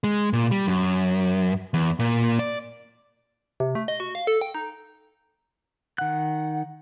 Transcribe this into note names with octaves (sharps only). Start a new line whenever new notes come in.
G#3
A#2
G3
F#2
E2
A#2
D5
C3
A3
D#5
F#4
F5
A4
G5
D#4
D#3 F#5 F#6